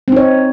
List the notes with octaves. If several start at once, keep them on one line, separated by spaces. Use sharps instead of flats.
C4 D#4 C#5